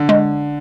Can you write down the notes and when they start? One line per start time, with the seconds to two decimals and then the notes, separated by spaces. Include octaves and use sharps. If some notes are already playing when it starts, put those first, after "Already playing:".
Already playing: D3
0.09 G#3